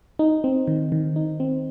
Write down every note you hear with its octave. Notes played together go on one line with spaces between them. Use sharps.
D#4
C4
D#3
D#3
D#4
C4